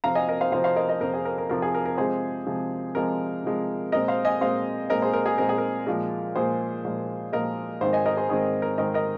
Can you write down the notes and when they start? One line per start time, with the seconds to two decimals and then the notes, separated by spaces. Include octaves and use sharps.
0.04 F2 C3 F3 C4 F5 A#5
0.15 D#5 G#5
0.28 A#4 D#5
0.41 C5 F5
0.52 F2 C3 F3 C4 C5 F5
0.64 C5 F5
0.76 A#4 D#5
0.89 A#4 D#5
1.01 F2 C3 F3 C4 A#4
1.14 G#4
1.25 A#4
1.38 A#4
1.49 F2 C3 F3 C4 A#4
1.62 G#4
1.75 A#4
1.85 A#4
1.98 C3 F3 G#3 G#4 C5
2.46 C3 F3 G#3
2.95 C3 F3 G#3 A#4
3.43 C3 F3 G#3
3.92 A#2 G#3 C4 A#4 D#5
4.08 C5 F5
4.25 D#5 G#5
4.41 A#2 G#3 C4 C5 F5
4.90 A#2 G#3 C4 A#4 D#5
5.02 G#4 C5
5.13 A#4
5.26 G#4
5.38 A#2 G#3 C4 A#4
5.49 G#4
5.58 A#4
5.87 A#2 F3 G#3
6.36 A#2 F3 G#3 G#4 C5
6.85 A#2 F3 G#3
7.32 A#2 F3 G#3 A#4 D#5
7.81 G#2 D#3 G#3 C4 C5 F5
7.93 D#5 G#5
8.06 A#4 D#5
8.17 G#4 C5
8.29 G#2 D#3 G#3 C4 G#4 C5
8.62 A#4
8.78 G#2 D#3 G#3 C4 A#4 D#5
8.94 A#4 D#5